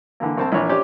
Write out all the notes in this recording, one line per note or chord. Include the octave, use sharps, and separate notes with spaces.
D3 E3 A#3
C2 C4 A5
A#1 E3 C#5
C#4 G4 C5 D5